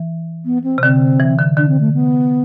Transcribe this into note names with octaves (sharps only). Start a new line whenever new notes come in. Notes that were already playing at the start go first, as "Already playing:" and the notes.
Already playing: E3
B3
C4
C3
D3 C4
E3
D3
D3 D4
C4
A3
B3